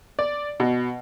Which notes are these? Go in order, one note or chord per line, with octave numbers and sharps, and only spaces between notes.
D5
B2